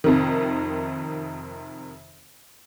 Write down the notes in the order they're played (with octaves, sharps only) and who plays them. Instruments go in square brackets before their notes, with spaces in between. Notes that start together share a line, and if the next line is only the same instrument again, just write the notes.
[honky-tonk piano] F2 C3 D#3